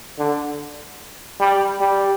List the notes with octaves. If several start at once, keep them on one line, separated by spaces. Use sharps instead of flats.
D3
G3
G3